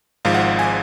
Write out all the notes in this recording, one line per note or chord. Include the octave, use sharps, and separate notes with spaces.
G#1 G#2 F3 F5
F#5
F5
G#5